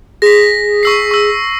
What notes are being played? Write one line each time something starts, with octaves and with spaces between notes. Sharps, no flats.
G#4 A#6 B6
C#6 E6 C7
C#6 E6